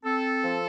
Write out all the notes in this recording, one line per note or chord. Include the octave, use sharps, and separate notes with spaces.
C4 A4
F3